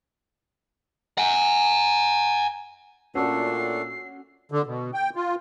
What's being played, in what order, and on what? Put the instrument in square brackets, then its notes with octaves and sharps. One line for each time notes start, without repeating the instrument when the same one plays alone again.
[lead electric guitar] F#5 G#5
[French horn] A#2 [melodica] A3 D4 A4 [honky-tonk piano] C#4 F#4 [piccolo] C7
[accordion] D3
B2
G5
F4